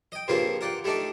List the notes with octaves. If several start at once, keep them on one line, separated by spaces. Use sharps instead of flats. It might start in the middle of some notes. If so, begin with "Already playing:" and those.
D#5 G5
G2 C#3 F3 A#3 C4 F4
A#4 D5 F#5 G5
G3 A3 D4 D#4 D5